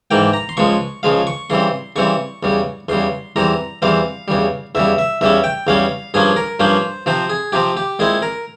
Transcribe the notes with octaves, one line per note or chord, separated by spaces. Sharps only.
G#2 E3 A#3 G5
A#5
C6
C#2 C#3 F3 G#3 C#6
C#2 C#3 F3 G#3 F5
C#6
C#3 E3 G3 C4 C6
C#3 E3 G3 C4 C#6
E2 C#3 G3
E2 C#3 G3 C6
E2 E3 G3 C4 A#5
E2 E3 G3 C4 F5
E2 C#3 G3
E2 C#3 G3 E5
E5
E2 C#3 G3 C#4 E5
G5
E2 C#3 G3 C#4 F5
G2 F3 A#3 C#4 G#4
A#4
G2 F3 A#3 C#4 C5
C3 F3 C4 C5
G#4
C3 F3 C4 G4
G4
A#2 G#3 C4 E4 G#4
A#4